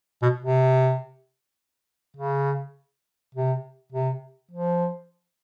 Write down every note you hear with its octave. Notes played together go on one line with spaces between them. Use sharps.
B2
C3
C#3
C3
C3
F3